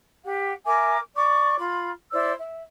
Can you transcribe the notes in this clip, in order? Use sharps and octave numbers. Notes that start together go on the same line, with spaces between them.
G4 F#5
A#4 E5 G#5 D6
D5 C#6 D6
F4 B5
E4 C5 D5 E6
E5